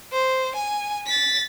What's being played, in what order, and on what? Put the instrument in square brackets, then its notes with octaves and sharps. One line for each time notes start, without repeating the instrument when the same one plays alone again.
[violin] C5
G#5
A6 B6